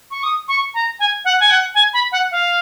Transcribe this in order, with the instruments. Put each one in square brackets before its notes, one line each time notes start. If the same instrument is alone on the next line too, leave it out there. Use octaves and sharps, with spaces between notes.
[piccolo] C#6
D#6
C#6
A#5
G#5
F#5
G#5
F#5
G#5
B5
F#5
F5